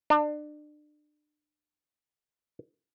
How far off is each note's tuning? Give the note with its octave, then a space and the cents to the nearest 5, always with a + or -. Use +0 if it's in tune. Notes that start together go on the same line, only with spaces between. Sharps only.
D4 +30